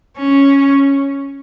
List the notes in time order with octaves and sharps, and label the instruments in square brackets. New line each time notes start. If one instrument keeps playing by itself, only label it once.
[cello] C#4